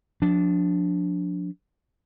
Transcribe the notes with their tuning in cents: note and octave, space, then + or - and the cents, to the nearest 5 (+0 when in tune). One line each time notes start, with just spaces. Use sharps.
F3 +35 D4 -15